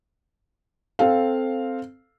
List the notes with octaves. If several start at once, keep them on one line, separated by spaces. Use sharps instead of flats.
C4 A4 F5